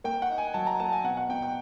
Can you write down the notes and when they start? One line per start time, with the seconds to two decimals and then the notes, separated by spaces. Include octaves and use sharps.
0.04 A#3 G5
0.22 F#5
0.30 D#4
0.38 G#5
0.54 F#3 A5
0.67 A#5
0.80 A#3 A5
0.92 G#5
1.04 B2 F#5
1.17 F#5
1.29 B2 G5
1.42 G5